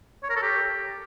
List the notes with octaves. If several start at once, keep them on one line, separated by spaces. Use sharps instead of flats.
C#5
A#4
A4
G4